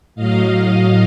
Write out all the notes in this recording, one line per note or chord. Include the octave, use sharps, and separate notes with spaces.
A2 F#3 D#5 F5